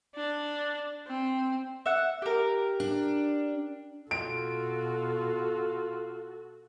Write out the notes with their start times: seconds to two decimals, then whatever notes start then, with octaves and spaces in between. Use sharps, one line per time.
0.15 D4
1.07 C4
1.86 E5 F#5
2.22 G4 A#4
2.80 D4
4.11 B2 F4 F#4 A4 D7